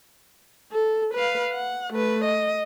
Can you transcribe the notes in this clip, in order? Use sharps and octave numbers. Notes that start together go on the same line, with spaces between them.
A4
B4 F5
F#5
A3 B4
D#5